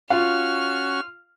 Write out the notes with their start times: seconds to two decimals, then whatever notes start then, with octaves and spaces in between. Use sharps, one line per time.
0.10 C#4 F4 F#4 F5 F6